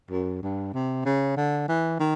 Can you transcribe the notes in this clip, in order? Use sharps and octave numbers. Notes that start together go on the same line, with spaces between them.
F#2
G2
C3
C#3
D3
E3
D#3